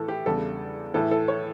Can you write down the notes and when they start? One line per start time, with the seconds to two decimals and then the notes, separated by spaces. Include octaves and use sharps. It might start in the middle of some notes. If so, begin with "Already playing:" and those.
Already playing: A2 E3 A3 A4
0.08 G4
0.26 E2 C#3 G3 D4 A4
0.94 A2 E3 A3 E4 A4
1.11 A4
1.28 C#5